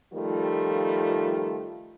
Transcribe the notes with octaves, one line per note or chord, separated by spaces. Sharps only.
D#3 F3 G3 A3 F4